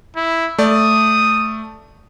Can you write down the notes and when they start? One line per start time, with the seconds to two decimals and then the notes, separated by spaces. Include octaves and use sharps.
0.16 E4
0.58 A3 D5 D#6